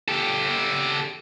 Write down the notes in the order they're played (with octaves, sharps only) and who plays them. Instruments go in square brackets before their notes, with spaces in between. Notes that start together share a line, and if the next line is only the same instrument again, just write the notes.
[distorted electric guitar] G4 A4